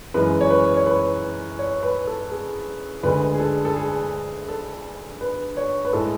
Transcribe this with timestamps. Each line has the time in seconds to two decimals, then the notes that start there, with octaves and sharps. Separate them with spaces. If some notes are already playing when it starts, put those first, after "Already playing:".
0.14 F#2 E3 G#3 B4
0.41 C#5
0.50 B4
0.77 C#5
0.86 B4
1.59 C#5
1.83 B4
2.07 A4
2.31 G#4
3.03 D2 D3 G#3 B4
3.35 G#4
3.39 A4
3.65 A4
3.76 G#4
4.48 A4
5.21 B4
5.57 C#5
5.85 B4
5.93 A2 G#3 A4